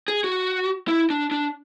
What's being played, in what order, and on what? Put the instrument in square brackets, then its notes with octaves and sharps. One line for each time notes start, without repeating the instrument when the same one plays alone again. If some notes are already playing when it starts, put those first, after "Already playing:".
[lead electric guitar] G#4
F#4
E4
D4
D4